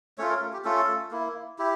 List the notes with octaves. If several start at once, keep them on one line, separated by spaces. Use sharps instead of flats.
A3 C#4 F4 C#5
A#4
G4
A3 C#4 F4 A4
A#3 E4
E4 G4